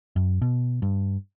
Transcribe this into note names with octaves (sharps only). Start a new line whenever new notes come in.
F#2
B2
G2